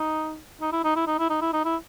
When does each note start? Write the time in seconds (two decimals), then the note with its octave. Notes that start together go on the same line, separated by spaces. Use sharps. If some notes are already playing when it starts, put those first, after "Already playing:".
Already playing: D#4
0.61 D#4
0.72 E4
0.84 D#4
0.96 E4
1.07 D#4
1.19 E4
1.30 D#4
1.41 E4
1.53 D#4
1.65 E4